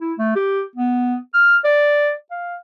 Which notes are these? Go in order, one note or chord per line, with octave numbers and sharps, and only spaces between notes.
E4
A3
G4
B3
F6
D5
F5